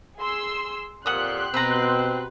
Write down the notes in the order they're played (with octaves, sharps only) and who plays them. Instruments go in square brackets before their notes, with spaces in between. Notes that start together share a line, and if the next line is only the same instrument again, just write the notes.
[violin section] G#4 C6 E6
[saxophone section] F2 A#2 [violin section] G4 C6 F#6 [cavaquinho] F#5 D#6
[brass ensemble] B2 [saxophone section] C4 [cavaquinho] B4 A#5